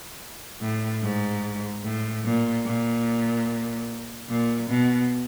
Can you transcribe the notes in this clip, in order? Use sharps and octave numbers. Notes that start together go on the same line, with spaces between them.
A2
G#2
A2
A#2
A#2
A#2
B2